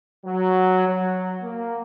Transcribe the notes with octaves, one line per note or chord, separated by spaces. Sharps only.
F#3
F#3
A#3